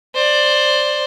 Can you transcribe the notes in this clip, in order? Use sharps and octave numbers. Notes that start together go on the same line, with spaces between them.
C5 D5